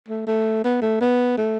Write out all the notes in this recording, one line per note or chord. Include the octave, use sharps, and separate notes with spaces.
A3
A3
B3
A3
B3
A3